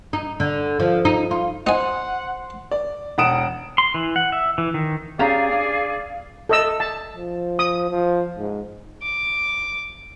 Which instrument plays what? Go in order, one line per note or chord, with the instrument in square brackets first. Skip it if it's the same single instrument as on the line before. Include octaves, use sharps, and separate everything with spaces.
[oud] D#4
D3
F3
D#4
F4
[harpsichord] D#4 G#5 [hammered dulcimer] C5 [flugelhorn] F#5
[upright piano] D5
E1 F#5 D#6 D7 E7
[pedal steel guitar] C6
E3
F#5
E5
E3
D#3
[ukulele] C#4 G4 A#5 [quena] G#4 [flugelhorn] D5 [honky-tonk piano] F5 A6
[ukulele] D4
[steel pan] A4 D#5 E6
A5
[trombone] F3
[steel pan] D#6
[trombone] F3
G#2
[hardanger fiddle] D6